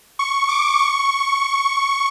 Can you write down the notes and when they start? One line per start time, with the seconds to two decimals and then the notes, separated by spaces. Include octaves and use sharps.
0.19 C#6
0.49 D6
0.79 C#6